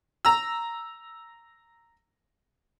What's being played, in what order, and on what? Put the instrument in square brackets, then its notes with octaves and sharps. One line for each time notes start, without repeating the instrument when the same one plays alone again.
[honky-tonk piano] A#5 E6